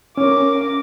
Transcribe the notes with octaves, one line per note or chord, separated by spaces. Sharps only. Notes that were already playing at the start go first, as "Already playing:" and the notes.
C#4 A#4 D6